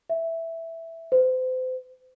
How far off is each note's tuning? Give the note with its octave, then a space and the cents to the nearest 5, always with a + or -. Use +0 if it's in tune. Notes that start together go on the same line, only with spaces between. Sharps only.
E5 +0
C5 -35